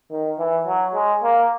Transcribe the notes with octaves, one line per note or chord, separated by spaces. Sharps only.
D#3
E3
F#3
G#3
A#3